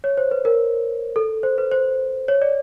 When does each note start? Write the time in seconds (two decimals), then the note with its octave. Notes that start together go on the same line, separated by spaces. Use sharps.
0.04 C#5
0.17 C5
0.31 B4
0.45 A#4
1.16 A4
1.43 C5
1.58 B4
1.72 C5
2.28 C#5
2.42 D5